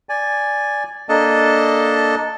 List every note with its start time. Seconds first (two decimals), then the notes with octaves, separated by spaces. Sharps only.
0.09 D5 G#5
1.09 A#3 D4 A4 D#5 A5